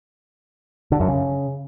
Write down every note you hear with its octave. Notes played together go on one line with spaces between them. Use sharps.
D3
F#2
C#3